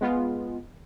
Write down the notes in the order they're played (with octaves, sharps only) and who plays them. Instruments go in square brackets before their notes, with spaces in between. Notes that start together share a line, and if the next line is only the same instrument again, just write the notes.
[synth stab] G#3 B3 F4